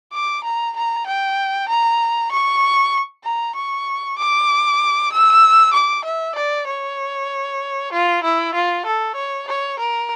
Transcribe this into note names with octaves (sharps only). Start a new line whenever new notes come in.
D6
A#5
A#5
G5
A#5
C#6
A#5
C#6
D6
E6
D6
E5
D5
C#5
F4
E4
F4
A4
C#5
C#5
A#4